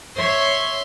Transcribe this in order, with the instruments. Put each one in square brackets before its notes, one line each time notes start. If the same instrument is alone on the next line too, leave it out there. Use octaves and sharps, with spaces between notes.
[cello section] C#5 [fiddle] E5 C6